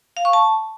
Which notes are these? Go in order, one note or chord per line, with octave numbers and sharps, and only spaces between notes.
F5
C#6
A5